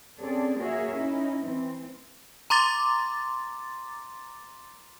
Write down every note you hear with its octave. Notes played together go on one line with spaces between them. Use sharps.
C4 C#4 G#4 A4 D5
A#3 F#4 G#4 A#4 C#5 E5
C#4 D#4 E4
E3 C4
A#5 C6 D6 A6